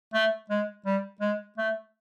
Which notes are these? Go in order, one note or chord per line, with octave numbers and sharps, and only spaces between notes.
A3
G#3
G3
G#3
A3